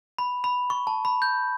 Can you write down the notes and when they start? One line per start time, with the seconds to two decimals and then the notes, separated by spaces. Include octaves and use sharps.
0.18 B5
0.44 B5
0.70 C#6
0.87 A5
1.05 B5
1.22 G6